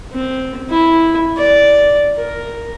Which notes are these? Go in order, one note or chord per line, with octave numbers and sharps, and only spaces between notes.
C4
E4
D5
A#4